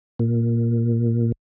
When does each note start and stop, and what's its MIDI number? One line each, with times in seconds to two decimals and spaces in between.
0.19 1.32 46